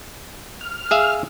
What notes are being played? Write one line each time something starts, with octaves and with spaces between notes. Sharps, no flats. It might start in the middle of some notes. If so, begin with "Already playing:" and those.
F6
G#4 E5 F5